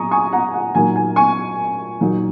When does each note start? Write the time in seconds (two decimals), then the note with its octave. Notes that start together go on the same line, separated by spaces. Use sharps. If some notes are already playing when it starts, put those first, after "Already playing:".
Already playing: A#2 F#3 G#5 A#5 C#6 D#6
0.11 G#5 C#6
0.33 F#5 A#5
0.54 F#5
0.75 A#2 F#3 A#3 D#4 G#5
0.96 G#5
1.16 G#5 C#6
2.01 A#2 F#3 A#3 D#4